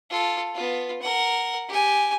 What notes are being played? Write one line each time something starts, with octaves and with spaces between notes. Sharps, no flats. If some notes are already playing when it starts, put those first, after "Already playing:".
F4 A4
B3 F4
A#4 F#5
G4 G#5